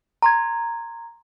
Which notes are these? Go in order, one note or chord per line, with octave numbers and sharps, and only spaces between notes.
A#5 C6 G#6